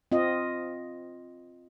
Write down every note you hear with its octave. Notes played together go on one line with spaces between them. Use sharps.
C4 F4 D#5